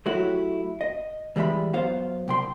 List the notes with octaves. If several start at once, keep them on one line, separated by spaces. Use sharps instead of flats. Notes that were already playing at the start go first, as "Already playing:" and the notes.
F#3 A3 E4 F#4 G4
D#5
E3 G3 G#3 E5 B5
F#2 F#3 B3 F4 C5 F5
C2 G5 C6